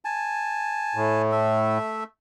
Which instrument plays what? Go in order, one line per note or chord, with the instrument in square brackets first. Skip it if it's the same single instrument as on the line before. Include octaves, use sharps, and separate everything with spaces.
[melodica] G#5 A5
[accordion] A2
[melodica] A3 E5